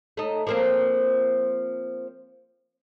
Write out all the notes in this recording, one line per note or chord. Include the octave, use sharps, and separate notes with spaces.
A3 D#4
F3 A#3 C4